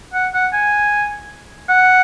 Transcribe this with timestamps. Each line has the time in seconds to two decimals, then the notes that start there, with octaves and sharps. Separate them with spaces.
0.14 F#5
0.34 F#5
0.53 G#5
1.69 F#5